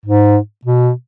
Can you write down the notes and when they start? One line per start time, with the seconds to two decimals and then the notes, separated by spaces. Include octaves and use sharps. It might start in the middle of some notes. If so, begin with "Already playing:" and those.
0.06 G#2
0.65 B2